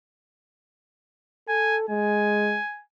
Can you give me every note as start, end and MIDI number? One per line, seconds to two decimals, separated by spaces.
1.48 1.85 69
1.48 1.78 80
1.89 2.59 56
1.89 2.83 80